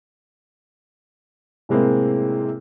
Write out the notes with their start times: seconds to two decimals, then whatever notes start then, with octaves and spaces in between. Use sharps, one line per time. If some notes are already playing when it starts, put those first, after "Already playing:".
1.69 A2 C3 G#3 A#3 C4 E4